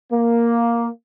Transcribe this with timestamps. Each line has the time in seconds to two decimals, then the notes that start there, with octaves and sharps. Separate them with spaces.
0.12 A#3